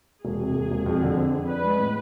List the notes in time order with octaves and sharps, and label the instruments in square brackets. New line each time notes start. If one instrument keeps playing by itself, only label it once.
[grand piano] E1 [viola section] G#4
[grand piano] C3
E1
E1
F2
D3
C4
F2
[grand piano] D4 [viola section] B4
[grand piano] G#3
A2